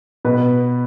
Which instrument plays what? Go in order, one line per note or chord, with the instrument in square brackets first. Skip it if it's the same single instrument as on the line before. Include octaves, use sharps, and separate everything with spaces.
[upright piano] B2 B4